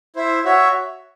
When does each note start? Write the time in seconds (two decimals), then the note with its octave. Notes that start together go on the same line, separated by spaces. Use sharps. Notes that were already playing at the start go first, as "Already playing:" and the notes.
0.16 E4 C5 E5
0.45 F#4 C#5 E5